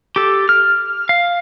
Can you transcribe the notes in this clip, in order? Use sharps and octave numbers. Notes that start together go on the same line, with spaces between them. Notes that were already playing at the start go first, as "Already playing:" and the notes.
G4 A4
F6
F5